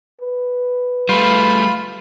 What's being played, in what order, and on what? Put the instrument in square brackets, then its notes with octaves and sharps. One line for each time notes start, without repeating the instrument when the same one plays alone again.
[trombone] B4
[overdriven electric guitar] G3 A3 [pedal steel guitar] F4 [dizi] B5